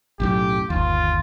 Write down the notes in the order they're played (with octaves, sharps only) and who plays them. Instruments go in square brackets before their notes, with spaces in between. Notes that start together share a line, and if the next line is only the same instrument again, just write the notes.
[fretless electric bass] B1 F#2 A2 [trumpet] G4
[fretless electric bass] G1 D#2 [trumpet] F4